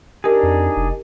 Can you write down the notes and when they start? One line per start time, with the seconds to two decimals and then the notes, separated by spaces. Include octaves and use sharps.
0.24 D4 D#4 G4 G#4 A#4
0.43 F2
0.77 F1